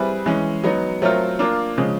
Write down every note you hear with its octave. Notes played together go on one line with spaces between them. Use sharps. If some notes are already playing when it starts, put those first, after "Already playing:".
Already playing: G3 C4 E4 G#4 B4
E3 G#3 C#4
F#3 B3 D#4
F#3 A3 C4 F4 A#4
A#3 D4 F4 A#4
C#3 F3 G#3